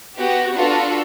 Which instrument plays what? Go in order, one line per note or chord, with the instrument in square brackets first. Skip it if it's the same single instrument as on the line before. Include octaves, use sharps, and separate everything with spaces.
[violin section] B3 F#4 G4
D4 F4 F#4 A4 B4